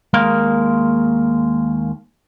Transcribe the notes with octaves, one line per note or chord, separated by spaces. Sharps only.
D#2 G#3 A#3 A#4 F5